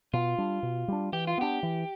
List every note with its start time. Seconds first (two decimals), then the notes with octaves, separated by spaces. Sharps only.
0.13 B2 F4
0.38 G3 D4
0.63 B2
0.88 G3 D4
1.13 E3 G4
1.27 F4
1.38 B3 D4 G4
1.63 E3